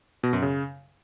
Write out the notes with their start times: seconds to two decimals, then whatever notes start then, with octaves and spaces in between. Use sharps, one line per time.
0.23 B2
0.33 F#2
0.42 C#3